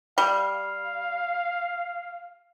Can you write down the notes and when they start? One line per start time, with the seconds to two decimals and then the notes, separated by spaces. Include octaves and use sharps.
0.18 G3 F5